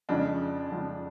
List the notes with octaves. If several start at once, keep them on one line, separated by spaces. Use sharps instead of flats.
F2 C#3 F3 G#3 D4
F2 C#3 F3 G#3